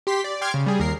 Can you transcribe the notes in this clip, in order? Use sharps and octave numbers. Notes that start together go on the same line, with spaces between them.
G4 C6 B6
D5
G5 C6 D6 F6 G#6
C#3
G3 G#4
D#2 A#4 C7